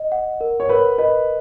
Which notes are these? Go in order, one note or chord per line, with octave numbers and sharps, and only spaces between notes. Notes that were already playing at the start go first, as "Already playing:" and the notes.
Already playing: D#5
F#5
A#4
C#5
A#4 B4
B4 D#5